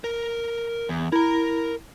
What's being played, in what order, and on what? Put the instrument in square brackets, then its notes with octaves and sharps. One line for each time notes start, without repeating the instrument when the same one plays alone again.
[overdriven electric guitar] A#4
E2
[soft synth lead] E4 [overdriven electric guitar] A#4 A#5